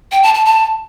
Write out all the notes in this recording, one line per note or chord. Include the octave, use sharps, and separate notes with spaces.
G5
A5
A5
A5